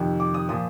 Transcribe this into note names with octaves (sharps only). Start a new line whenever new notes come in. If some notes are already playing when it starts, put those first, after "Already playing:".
Already playing: F2 C3 D#3
D6
D#6
A#2 F3 D#6